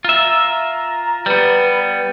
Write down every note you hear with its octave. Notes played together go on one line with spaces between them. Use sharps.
F4 E5 A#5
G3 B3 B4